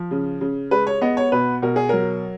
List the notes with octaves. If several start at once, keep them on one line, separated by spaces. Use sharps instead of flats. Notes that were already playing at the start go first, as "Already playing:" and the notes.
Already playing: F3
C#3
C#3
G#3 B4
C#5
B3 D#5
C#5
B2 B4
B2 A#4
G#4
F#3 A#4